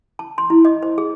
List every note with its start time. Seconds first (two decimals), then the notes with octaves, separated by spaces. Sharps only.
0.19 A5
0.38 C6
0.50 E4
0.65 D#5
0.83 C5
0.98 G#4